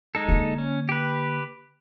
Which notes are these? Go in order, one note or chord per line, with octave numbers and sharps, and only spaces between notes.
G#3 D#4 A4
D3 A#3
C#4
G4 B4